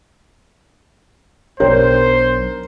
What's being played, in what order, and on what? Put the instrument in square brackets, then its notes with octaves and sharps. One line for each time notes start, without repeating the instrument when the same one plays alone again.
[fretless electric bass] B1 D4 [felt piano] A#4 [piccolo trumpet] C5 [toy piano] C#5 G5